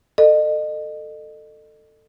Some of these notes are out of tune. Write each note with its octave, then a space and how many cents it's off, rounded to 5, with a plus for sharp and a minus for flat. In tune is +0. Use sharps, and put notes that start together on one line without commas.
A4 +15 D#5 -35